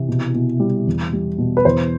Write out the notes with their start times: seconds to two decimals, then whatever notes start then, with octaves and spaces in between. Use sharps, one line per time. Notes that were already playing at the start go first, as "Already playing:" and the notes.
Already playing: C3 E3
0.08 B2
0.34 B2
0.60 G3
0.87 E2
1.13 G3
1.38 B2
1.57 B4
1.65 E2 C5